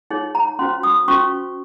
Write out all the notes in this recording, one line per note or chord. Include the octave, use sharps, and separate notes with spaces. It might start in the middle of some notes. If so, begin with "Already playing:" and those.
D#4 G#4 C#5
A#5
C#4 F#4 C5 C6
D#6
C#4 F#4 C5 C#6